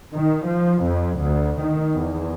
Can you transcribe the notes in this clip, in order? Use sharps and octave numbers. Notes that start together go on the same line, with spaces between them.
D#3
F3
F2
D2
D#3
E2